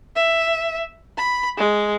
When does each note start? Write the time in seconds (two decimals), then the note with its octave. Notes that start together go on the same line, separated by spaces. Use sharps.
0.16 E5
1.17 B5
1.57 G#3